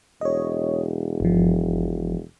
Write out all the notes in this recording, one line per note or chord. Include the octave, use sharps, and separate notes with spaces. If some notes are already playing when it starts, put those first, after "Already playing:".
E1 C#5 D#5
G1 F3